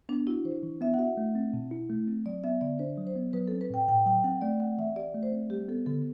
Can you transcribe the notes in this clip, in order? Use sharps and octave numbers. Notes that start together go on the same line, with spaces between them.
B3 D4
E4 F#4
E3 C5
E3
B3 E5
F#5
F#4 E5
A3
C4
B2
E4
A3
C4
F#3 D5
B3 E5
D3 D5
D4 C5
F#3
C5
B3
F#3 B4
C4 A4
B4
A2 G5
A2 G5
F#3 G5
C4 F#5
A3 D5
C4 F#5
E3 E5
G4 D5
A3
C5
C4
G3 G4
B3 A4
D3 A4